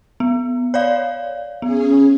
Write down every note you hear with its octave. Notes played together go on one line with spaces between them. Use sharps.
B3
C#5 D5 F5
B3 C#4 G#4